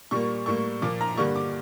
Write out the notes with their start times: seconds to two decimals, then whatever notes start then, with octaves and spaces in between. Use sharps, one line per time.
0.11 A#2 G3 A#3 C#6
0.46 A2 G3 A#3 C#6
0.82 A#2 F3 A#3 D6
1.01 A#5
1.17 G2 D3 G3 A#3 C#6
1.35 D6